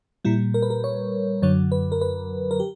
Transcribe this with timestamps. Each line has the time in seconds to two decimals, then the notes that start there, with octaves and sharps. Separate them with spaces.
0.25 A#2 G3 E4
0.54 A#4
0.62 B4
0.70 A#4
0.84 C#5
1.42 F#2 D3 F#3 C#5
1.72 B4
1.92 A#4
2.01 B4
2.51 A#4
2.60 G4